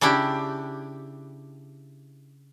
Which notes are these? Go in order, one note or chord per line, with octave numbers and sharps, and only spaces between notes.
C#3 D4 E4 G4